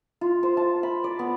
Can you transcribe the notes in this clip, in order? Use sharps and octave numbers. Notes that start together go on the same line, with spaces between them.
F4
C5
A5
B5
D5
B3